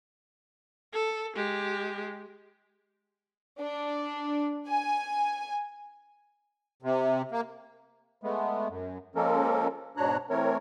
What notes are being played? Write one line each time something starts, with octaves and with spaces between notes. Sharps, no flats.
A4
G#3 G4
D4
G#5
C3
A#3
G#3 A3 B3
F#2
F3 G#3 A#3 C#4 A4 A#4
G#2 B2 D4 C#5 A#5 F#6
E3 A3 C4 A#4 C#5